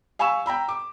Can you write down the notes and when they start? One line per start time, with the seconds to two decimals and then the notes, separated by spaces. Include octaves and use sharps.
0.19 F5 G#5 B5 C#6 E6 E7
0.46 G5 A#5 B5 E6
0.68 D6